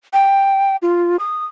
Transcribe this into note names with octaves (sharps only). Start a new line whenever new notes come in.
G5
F4
D#6